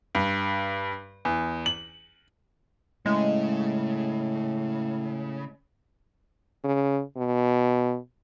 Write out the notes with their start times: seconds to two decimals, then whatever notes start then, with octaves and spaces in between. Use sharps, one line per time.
0.15 G2
1.25 E2
1.66 F#7
3.06 A2 C#3 G#3
6.64 C#3
7.17 B2